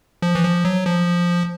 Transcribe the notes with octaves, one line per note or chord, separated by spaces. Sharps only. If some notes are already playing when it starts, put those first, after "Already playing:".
F3
E3
F3
F#3
F3